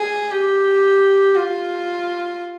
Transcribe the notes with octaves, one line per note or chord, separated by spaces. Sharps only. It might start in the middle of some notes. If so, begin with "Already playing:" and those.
Already playing: G#4
G4
F4